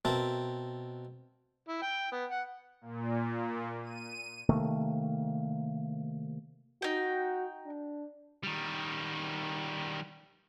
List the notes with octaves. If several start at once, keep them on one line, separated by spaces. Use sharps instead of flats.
B2 C4 A#4 E5 A5
E4
G5
B3
F#5
A#2
D#7
C3 D#3 A3 A#3
D#4 F#4 G5
D4
D#3 G3